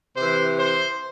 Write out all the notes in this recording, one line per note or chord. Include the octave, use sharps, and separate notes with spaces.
C3 E3 C5
C5